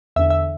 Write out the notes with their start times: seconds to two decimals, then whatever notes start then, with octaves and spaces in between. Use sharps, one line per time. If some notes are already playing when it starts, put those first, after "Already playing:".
0.16 E2 D3 E5
0.30 E5